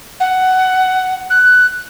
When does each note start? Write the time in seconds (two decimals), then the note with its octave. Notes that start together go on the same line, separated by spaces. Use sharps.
0.20 F#5
1.30 F#6